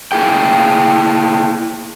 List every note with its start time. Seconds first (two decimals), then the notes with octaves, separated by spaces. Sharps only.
0.12 A#3 E4 G#4 G5